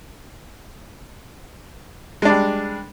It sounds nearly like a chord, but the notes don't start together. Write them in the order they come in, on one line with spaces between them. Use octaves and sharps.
G#3 D4 G3